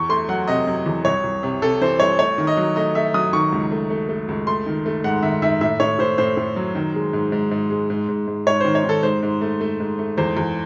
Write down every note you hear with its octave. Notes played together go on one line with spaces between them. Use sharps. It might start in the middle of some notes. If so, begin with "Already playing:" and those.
Already playing: E2 C#6
A3 C6
F#3 F#5
C3 D#5
F#3
E2
C2 C#5
C2
C3
C3 A4
E3 C5
C2 C#5
A3 C#5
D#3
D#5
F#3
A3 D#5
A3 E5
F#3 D#6
D#3 C#6
C#2
A3
A3
A3
C#2
A3 C6
D#3
A3
G#2 F#5
D#3 E5
D#3 E5
A2 E5
A2 C#5
A2 C5
A2 C5
A2
F#3
D#3
G#3
G#2
G#2
G#2
G#3
G#2
G#2
G#2
G#2 C#5
D#3 C5
C#5
D#3
A4
G#2 C5
G#2
A3
A3
G#2
A3
E2 C5
E2